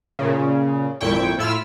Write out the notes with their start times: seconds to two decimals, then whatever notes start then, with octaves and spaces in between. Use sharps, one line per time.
0.19 A#2 C#3
1.01 G#1 F2 A#2 E4 G5 C#6
1.38 A2 E4 F4 E6 F6